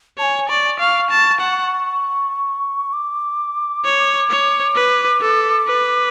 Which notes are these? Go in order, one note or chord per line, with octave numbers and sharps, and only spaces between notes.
C#5 G#5 A5
D5 C#6
F5 C#6
A5
F#5
D6
C#5
C#5
B4
A4
B4